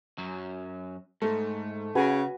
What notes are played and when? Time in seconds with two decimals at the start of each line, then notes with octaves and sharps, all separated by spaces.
0.18 F#2 F#3
1.22 G#2 A3
1.95 C#3 F#4 B4 G#5